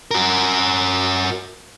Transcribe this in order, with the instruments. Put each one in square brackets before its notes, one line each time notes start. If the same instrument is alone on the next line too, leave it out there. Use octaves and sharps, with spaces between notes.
[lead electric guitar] F#4 A#4